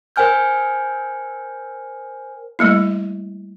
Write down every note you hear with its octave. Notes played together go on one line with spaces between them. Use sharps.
A#4 C5 G5 G#5 F6 G6
G3 A3 A#3 E4